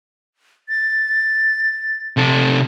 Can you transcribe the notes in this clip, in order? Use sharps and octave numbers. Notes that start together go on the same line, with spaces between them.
A6
C3 A4